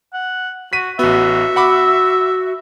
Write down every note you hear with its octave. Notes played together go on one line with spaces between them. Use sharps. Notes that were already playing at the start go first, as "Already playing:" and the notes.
F#5
F#4 B6 D#7
A1 B3 F#4 E5
F#5 B5 D6